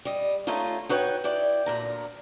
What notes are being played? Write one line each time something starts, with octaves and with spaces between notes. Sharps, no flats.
G3 D#5
A3 A#3 C#4 D#4 F4
D#4 F#4 B4 C#5 E5 G5
E4 D5 G5
D2 A#2 A#5